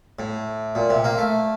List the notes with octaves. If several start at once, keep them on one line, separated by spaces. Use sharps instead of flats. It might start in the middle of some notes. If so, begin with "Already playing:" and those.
A2
A#2
C3
A#3
A3